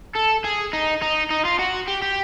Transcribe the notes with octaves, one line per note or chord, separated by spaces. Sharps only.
A4
G#4
D#4
D#4
D#4
F4
F#4
G4
G4